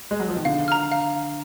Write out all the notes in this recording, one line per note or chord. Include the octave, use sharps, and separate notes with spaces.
G#3
F#3
F3
D#3
D3 F5
A#5 F6
F5